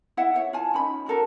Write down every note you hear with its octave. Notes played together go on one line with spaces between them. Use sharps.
E4 E5 F#5
E4 C#5
F4 G#5 A5
C#4 D#4 B5
C#4 F#4 A4 A#4